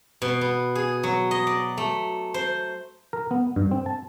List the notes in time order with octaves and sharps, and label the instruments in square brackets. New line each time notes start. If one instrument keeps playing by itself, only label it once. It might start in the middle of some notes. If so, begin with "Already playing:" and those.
[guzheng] B2
B3
G#4
F#3
D#5
D5
A3
C5
[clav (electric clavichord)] A#4
B3
G2
C4
A5